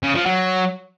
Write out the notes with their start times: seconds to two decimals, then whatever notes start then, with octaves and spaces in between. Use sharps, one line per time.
0.03 C#3
0.15 F3
0.26 F#3